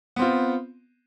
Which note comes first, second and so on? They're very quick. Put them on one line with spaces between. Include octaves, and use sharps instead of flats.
B3 C4 F4